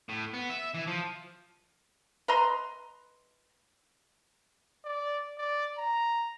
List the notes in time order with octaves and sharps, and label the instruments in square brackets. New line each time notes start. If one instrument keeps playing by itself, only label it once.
[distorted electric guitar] A2
B3
E5
E3
F3
[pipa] B4 D#5 A#5 C6
[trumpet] D5
D5
A#5